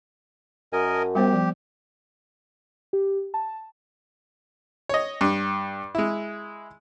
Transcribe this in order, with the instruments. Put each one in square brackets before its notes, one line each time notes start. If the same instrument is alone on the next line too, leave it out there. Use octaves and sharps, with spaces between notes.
[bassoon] F#2 [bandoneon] A#4 D#5 G#5
[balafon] A5
[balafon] G3 B3 C5 [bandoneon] G4
[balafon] F3
[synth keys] G4
A5
[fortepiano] C#5 D#5
G2
G#3 E4